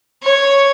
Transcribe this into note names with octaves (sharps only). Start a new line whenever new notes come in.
C#5